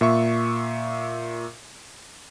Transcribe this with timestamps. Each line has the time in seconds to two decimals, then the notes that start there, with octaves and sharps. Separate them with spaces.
0.01 A#2 E5 C#6